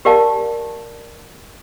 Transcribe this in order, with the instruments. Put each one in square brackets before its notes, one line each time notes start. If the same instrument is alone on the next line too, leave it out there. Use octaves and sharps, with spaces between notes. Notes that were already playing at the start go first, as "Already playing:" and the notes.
[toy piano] G4 A#4 D5 F5 G5 A5